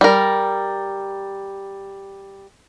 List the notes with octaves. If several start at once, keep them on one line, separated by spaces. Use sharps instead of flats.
G3 A#4